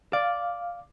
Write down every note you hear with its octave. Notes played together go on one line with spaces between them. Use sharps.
D5 F5